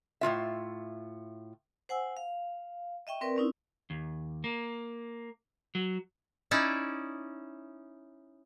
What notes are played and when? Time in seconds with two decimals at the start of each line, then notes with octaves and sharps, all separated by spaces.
0.21 A2 G#3 F4 E5
1.89 C5 F#5 G#5 E6
2.17 F5
3.07 D#5 E5 G5 C#6
3.21 C4 A#4 B4 D5
3.37 C4 C#4 D#4 E4
3.90 D#2
4.44 A#3
5.75 F#3
6.51 C#4 D#4 E4 D5